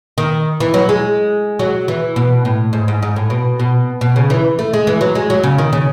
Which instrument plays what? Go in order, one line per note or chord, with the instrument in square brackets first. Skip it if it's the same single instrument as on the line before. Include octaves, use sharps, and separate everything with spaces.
[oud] D#3
E3
F#3
G#3
F#3
E3
B2
A2
G#2
G#2
G#2
A2
B2
B2
B2
C#3
E3
A3
G#3
E3
F#3
G#3
F#3
C#3
D#3
C#3